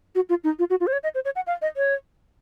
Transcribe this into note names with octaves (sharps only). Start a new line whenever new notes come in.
F#4
F4
D#4
F4
F#4
F4
C5
C#5
D#5
C5
C#5
F#5
F5
D#5
C#5